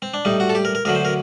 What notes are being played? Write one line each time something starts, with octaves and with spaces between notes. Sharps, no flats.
C4
D4
A2 G3 D#4
F#4
A4
G4
A#4
A#4
D2 D3 F#3 A#4
C5
A#4